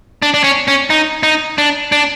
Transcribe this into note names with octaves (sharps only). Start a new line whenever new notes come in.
D4
D4
C#4
C#4
D#4
D#4
D4
D4